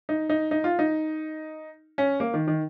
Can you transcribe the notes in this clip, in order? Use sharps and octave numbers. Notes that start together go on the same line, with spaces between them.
D#4
D#4
D#4
F4
D#4
C#4
A#3
D#3
D#3